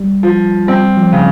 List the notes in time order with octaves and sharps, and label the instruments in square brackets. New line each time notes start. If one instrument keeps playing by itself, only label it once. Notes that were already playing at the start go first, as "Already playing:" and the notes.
Already playing: [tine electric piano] G3
[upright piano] F3
[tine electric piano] G3 [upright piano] C4
[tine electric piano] F3
[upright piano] C#3